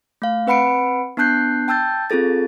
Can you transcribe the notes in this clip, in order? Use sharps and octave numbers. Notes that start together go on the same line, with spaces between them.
A3 F5
C4 B4 F#5 B5 C#7 D7
B3 D4 A5 F#6 G6 C7
G5 A5 E6 G6 A6
C4 F4 G#4 A4 A6